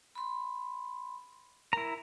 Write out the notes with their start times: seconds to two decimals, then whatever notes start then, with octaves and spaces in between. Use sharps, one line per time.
0.15 B5 C6
1.73 E4 A#4 A#5